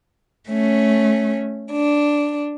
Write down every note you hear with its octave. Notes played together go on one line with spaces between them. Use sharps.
A3 C#4
D4